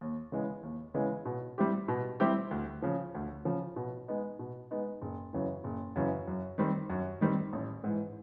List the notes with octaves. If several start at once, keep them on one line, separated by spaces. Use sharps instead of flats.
D#2
C#3 E3 G#3 B3
D#2
C#3 E3 G#3 B3
B2
G3 C4 E4 G4
B2
G3 C4 E4 G4
D2
C#3 F3
D2
C#3 F3
B2
G#3 B3 D#4
B2
G#3 B3 D#4
F#1
F#2 C#3 E3
F#1
F#2 C#3 E3
F#2
D#3 G3 C4
F#2
D#3 G3 C4
A1
G#2 E3